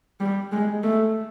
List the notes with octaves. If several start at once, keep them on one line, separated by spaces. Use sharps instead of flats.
G3
G#3
A3